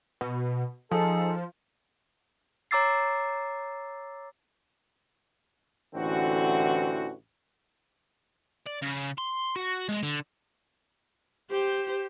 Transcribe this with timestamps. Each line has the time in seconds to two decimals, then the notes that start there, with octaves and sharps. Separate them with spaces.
0.21 B2
0.91 F3 D#4 G#4 A4
2.71 C#5 A#5 D6 E6 A6 C7
5.95 A1 D3 E3 C4 F#4
8.66 D5
8.82 C#3
9.18 C6
9.56 F#4
9.89 G#3
10.03 D3
11.50 G4 C5